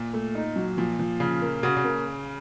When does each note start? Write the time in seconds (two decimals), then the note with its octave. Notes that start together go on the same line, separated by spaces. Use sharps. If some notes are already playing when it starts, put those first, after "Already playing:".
Already playing: A#2
0.13 A3
0.35 D#4
0.56 F#3
0.77 A#2 F3
0.99 F3
1.20 C#3 F3
1.42 A#3
1.63 C#3 F#4
1.77 C#3
1.84 A#3